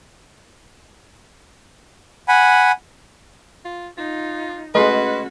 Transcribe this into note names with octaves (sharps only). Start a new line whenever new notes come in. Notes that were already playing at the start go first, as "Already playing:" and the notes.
F#5 G#5 B5
F4
D#4 F4
G#3 A3 C#4 F#4 B4 D#5 C6